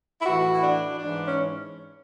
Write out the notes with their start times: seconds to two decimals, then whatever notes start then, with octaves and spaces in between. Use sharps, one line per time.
0.21 E4
0.26 A2 E3 F#4
0.53 E4
0.62 D4
0.99 G#2 E3 D4
1.25 C#4